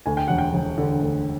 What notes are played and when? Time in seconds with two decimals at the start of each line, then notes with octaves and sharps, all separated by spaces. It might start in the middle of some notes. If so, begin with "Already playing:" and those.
0.06 D2 G#5
0.17 G5
0.28 E1 F#5
0.38 G5
0.54 E1
0.78 D3
1.02 D2